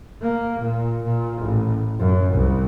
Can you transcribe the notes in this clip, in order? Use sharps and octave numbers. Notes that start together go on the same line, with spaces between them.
A#3
A#2
A#2
A1
F#2
C2